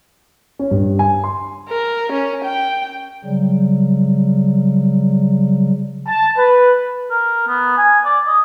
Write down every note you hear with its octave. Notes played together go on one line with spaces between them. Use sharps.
C#4
G2
G#5
C6
A#4
C#4
G5
C#3 F#3 G3
A5
B4
A#4
B3
G#5
D5
D#5